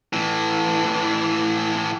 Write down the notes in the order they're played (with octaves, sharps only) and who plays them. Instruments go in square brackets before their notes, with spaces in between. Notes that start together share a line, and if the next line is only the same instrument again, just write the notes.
[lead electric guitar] A2 E3